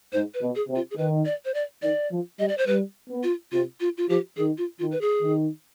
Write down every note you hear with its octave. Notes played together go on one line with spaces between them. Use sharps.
G#2 C5
B4
B2
G#4
C3
F4
G#4
D#3 B4
D5
C5
D5
D#3 D5
F3
G3 D#5
D5
C5
G3 B4
B3
F4
C3 F4
F4
F4
F3 G4
D#3 G#4
F4
D#3 F4
B4
G#4
D#3